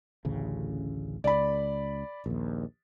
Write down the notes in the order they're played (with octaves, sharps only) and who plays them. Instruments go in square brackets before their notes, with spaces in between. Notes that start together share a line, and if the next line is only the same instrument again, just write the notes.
[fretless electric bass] A1 D2 C#3
[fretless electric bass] C#2 [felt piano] D5 B5
[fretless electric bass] A#1 D#2